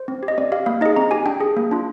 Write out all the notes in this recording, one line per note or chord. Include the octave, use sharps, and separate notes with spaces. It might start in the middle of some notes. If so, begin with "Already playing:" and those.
Already playing: C5
C4
G4
D#5
C4 D5
G4 F5
A#3 F5
D#4 G#4 D#5
C4 A#5
G4 G#5
D4 G5
G#4
A#3
D4 F4